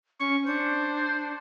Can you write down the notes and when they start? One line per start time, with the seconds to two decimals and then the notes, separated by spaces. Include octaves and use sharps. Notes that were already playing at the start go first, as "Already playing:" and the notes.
0.20 C#4 C#6
0.47 D4 C5